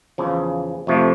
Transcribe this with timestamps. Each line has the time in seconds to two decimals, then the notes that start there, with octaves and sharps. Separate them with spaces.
0.18 E2 C#3 F3
0.87 F2 C3 F3 A3